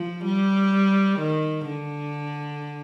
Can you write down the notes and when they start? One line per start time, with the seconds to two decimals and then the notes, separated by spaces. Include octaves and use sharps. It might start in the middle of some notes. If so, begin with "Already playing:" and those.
Already playing: F3
0.25 G3
1.19 D#3
1.66 D3